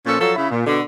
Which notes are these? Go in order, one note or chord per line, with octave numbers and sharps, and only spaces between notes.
A#2 F3 C#4 A4
F3 F#3 A4
C#3 E4
A#2
B2 D3